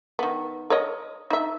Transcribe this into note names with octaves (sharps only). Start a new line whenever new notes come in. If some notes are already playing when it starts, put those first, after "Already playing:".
D#3 B3
A#4 C#5 D#5
D#4 E5